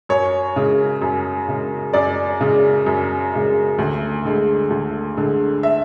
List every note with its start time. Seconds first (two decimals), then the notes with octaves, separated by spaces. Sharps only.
0.09 F#2 C#5
0.56 C#3 G#3
1.02 F#2
1.48 C#3 G#3
1.93 F#2 D5
2.40 C#3 G#3
2.86 F#2
3.33 C#3 G#3
3.78 D2
4.25 D3 G#3
4.70 D2
5.17 D3 G#3
5.63 E5